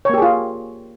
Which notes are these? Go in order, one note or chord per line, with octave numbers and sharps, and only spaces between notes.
A#3 F4 G4 G#4 C#5